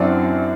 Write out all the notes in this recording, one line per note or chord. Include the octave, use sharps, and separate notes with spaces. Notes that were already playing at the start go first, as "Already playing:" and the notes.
Already playing: F#2 F#3 C4 D4 E4 D5